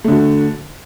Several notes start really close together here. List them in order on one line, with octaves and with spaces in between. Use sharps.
A3 D3 F#4